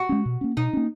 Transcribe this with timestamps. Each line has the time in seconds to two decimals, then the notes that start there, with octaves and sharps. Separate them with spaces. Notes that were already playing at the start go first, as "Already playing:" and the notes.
Already playing: F#4
0.09 G#3 C#4
0.26 B2
0.41 A#3 C#4
0.57 B2 D#4
0.73 A#3 C#4